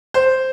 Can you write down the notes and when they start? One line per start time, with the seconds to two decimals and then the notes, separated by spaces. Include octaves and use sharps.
0.14 C5